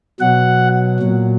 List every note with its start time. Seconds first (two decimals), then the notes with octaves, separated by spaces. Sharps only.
0.20 B2 F#3 F#5
1.00 A#2 F#3